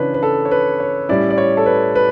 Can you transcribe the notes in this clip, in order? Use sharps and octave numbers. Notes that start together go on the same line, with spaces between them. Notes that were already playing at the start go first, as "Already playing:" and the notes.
Already playing: C#3 E3 D4 B4 C#5
B4
A4
C#5
B4
C#5
A2 G3 C#4 E4 D5
D5
C#5
A4
B4
B4